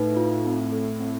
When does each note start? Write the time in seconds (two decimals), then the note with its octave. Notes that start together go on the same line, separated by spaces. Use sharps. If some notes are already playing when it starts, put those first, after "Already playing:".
Already playing: A2 D#4 B4
0.17 F4
0.45 C4
0.72 A4
1.00 C4